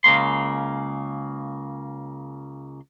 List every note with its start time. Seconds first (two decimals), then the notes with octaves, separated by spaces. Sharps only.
0.04 C#2 C#3 A#3 C6